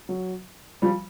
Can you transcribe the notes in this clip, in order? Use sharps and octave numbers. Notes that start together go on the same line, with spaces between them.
F#3
F3 G3